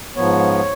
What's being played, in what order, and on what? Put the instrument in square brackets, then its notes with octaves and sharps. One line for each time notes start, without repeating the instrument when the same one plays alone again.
[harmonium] G#2 F3 B3 C#5